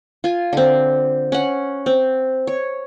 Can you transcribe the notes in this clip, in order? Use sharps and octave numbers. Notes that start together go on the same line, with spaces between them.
F4 G#5
D3 C4
C#4 F#5
C4
C#5